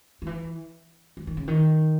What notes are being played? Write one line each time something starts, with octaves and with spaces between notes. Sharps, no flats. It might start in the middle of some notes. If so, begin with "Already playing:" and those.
D#3
E3
E3
D#3
C#3
D#3